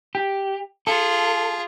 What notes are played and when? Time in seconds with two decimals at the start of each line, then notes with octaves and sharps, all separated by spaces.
0.15 G4
0.87 F4 G#4 A4